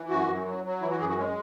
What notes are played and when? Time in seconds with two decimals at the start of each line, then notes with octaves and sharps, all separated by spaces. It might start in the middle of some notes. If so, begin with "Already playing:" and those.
Already playing: E3
0.09 F#2 F#4
0.27 F#2
0.46 F#3
0.64 F#3
0.81 E3 E4
0.91 F#4
0.99 F#2 G#4
1.09 F#4
1.17 G#3 C#4